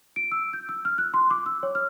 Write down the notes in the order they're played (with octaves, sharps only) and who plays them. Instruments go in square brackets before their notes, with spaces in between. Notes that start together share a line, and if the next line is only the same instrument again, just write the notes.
[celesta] D7
E6
G6
E6
F6
F#6
C6
D6
E6
C#5
F6